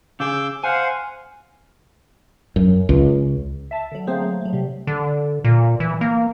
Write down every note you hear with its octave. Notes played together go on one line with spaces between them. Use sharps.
C#3 G#4 D6 E6 G6
C5 F5 F#5 G#5
F#2
C#2
E5 A5
D3 F#3
A3 A#3 C4 G#4 C5
F#3 A3
F#3 A3
C3 G3
D3
A#2
E3
A#3